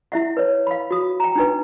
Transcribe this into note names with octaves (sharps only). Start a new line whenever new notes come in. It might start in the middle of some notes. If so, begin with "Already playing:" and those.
E4 E5 F#5
B4 C#5
F5 B5
F#4 D#6
G5 A#5
D4 D#4 B4